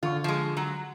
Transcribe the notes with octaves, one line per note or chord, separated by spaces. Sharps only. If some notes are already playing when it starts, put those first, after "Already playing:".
D3 F4 C#6
F3 G#3
F#3